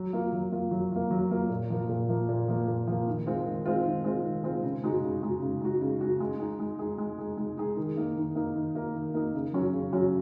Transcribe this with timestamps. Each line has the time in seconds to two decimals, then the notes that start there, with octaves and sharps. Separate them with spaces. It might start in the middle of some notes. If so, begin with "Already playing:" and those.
Already playing: F#3
0.13 A#3 F4
0.33 F#3
0.52 A#3 F4
0.71 F#3
0.92 A#3 F4
1.11 F#3
1.31 A#3 F4
1.50 A#2
1.70 F3 A#3
1.89 A#2
2.09 F3 A#3
2.29 A#2
2.48 F3 A#3
2.68 A#2
2.88 F3 A#3
3.07 D#3
3.27 G#3 C4 F4
3.45 D#3
3.66 G#3 C4 F4
3.85 D#3
4.04 G#3 C4 F4
4.25 D#3
4.44 G#3 C4 F4
4.64 C#3
4.84 G#3 D#4 F#4
5.03 C#3
5.22 G#3 D#4 F#4
5.41 C#3
5.62 G#3 D#4 F#4
5.81 C#3
6.01 G#3 D#4 F#4
6.20 G#3
6.40 D#4 G#4
6.59 G#3
6.79 D#4 G#4
6.98 G#3
7.18 D#4 G#4
7.37 G#3
7.57 D#4 G#4
7.77 D#3
7.97 A#3 D#4
8.17 D#3
8.35 A#3 D#4
8.55 D#3
8.75 A#3 D#4
8.95 D#3
9.14 A#3 D#4
9.35 C#3
9.53 F#3 C#4 F#4
9.73 C#3
9.92 F#3 C#4 F#4